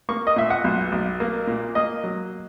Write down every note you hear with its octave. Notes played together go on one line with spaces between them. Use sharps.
A#3 C#6
D#5
A#2 E5
F#5
B1
B1
A#3
A#2
A#3 D#5
F#3